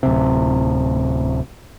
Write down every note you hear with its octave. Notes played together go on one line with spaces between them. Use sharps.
D1 C3